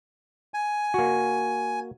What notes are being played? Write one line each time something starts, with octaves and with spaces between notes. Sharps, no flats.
G#5
A#3 F#4